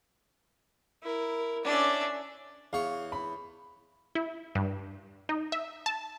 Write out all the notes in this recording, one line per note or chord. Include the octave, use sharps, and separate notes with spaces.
E4 A#4
C#4 D4 D5 E5
E2 C#5 F5
B5
E4
G2
D#4
E5
A5